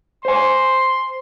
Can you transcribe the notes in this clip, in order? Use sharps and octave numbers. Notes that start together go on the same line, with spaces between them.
C5 G#5 C6